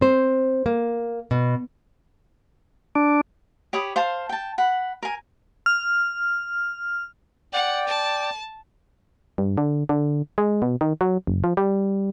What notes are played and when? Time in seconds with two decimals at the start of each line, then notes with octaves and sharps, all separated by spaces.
0.01 C4 C5
0.66 A#3
1.31 B2
2.95 D4
3.73 G4 C#5 B5 D#6
3.96 C5 F5 A5
4.29 G5 A5
4.58 F#5 B5
5.03 A#4 G#5
5.66 F6
7.53 D5 F#5 G5
7.88 A5
9.38 G2
9.58 D3
9.89 D3
10.38 G#3
10.62 B2
10.81 D#3
11.01 F#3
11.27 F#1
11.44 F3
11.57 G3